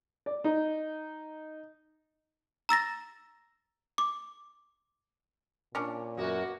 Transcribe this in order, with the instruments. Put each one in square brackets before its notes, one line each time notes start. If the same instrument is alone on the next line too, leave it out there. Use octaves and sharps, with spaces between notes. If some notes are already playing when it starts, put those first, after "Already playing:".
[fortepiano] D5
D#4
[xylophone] A#5 E6 A6 A#6
D6
[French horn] A#2 [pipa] C#4 D4
[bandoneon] F#2 [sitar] A#3 B3 F#4